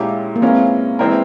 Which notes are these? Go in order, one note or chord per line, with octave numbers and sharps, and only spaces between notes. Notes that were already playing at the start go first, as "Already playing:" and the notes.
Already playing: A#2 G#3 C#4 E4 G4
A#3
E3 G#3 C4 C#4 F4 A#4
E3 G#3 C4 E4 A#4